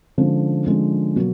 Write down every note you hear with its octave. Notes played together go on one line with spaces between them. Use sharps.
D3 F3 G#3 C#4
D3 F3 G#3 C#4
B2 F#3 A#3